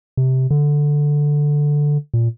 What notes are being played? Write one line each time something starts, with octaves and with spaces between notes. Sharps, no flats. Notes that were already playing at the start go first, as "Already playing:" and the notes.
C3
D3
A#2